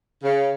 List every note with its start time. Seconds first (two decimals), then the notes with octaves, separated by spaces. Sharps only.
0.23 C#3